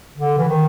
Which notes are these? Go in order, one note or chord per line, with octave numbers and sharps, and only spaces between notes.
D3
E3
D#3